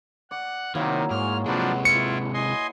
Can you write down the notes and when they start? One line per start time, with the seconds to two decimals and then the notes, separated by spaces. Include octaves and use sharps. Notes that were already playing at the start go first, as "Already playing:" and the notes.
0.31 D5 F#5
0.75 C3 D#3 F#3 A#3 E4
1.10 G#2 G#3 C#5 F6
1.46 C3 F3 F#3 G#3 D4 F#4 B4 A5
1.85 E4 F4 C#7
2.34 D#5 G#5 C6